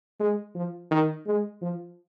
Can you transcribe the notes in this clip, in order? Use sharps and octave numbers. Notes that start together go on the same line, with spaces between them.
G#3
F3
D#3
G#3
F3